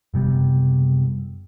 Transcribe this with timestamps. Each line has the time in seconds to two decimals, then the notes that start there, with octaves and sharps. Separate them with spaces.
0.14 F#1 C3 G3 B3